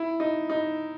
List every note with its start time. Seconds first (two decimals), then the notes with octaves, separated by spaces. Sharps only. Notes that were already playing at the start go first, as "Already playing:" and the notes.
Already playing: E4
0.20 D#4
0.50 D#4